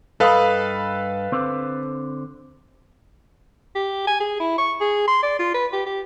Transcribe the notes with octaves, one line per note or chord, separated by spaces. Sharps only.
G2 A4 B4 D#5 F5 B5
D3 C4 C5
G4
G#5
G#4
E4
C#6
G#4
C6
D5
F4
B4
G4
G4